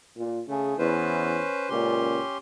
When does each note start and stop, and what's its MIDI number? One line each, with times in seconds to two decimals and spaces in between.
0.16 0.40 46
0.48 0.77 49
0.48 0.77 57
0.48 0.77 68
0.78 1.42 40
0.78 1.69 61
0.78 1.69 71
0.78 1.69 72
1.69 2.20 37
1.69 2.20 46
1.69 2.38 61
1.69 2.38 67
1.69 2.38 84